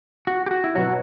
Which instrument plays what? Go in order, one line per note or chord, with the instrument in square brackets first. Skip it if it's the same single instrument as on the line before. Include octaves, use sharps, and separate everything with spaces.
[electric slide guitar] F#4
G4
F#4
E4
[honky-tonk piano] B2 F#3 [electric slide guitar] F#4